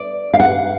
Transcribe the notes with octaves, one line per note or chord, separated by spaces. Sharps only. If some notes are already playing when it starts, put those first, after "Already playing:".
Already playing: D5
F5
F#5